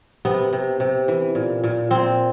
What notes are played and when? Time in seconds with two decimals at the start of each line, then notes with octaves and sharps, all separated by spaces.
0.25 C3 B3
0.53 C3
0.80 C3
1.08 E3
1.35 A#2
1.64 A#2
1.91 A#2 C4